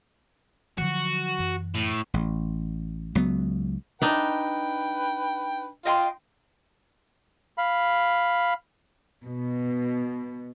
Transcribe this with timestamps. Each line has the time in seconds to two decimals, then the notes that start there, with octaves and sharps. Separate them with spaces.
0.78 D3 F3 F#3 F#4
1.39 F#2 E3
1.75 A2
2.14 A1
3.15 C#2 F#3 B3
4.02 D4 D#4 B4 G5
5.85 F4 D#5 G5 C6
7.58 F5 B5
9.25 B2